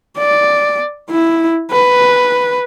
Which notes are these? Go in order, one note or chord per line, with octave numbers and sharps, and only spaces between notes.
D5
E4
B4